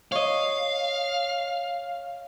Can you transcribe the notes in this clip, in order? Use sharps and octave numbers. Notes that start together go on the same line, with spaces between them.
C#5 D#5 F5